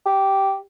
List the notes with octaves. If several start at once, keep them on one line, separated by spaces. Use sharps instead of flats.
G4